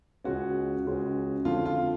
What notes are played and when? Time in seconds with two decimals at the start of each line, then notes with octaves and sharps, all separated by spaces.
0.24 C#2 C#3 G#3 C#4 F#4
0.85 C#2 C#3 G#3 C#4
1.45 F2 D3 F3 F4
1.65 F4